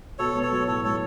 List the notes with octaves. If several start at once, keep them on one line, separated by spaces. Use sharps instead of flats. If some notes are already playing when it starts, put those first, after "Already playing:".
B2 A4 C#5
B3
A4 C#5
F#3
A2 A4 C#5
A3 A4 C#5